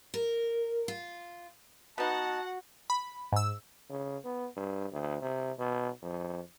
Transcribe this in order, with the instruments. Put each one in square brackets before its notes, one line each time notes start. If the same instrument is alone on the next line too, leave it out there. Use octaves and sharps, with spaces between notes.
[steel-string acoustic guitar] A#4
F4
[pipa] B3 D#4 [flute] F#4 [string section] F#5 [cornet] A5
[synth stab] B5
G#2 E6
[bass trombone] C#3
B3
G2
D2
C3
B2
F2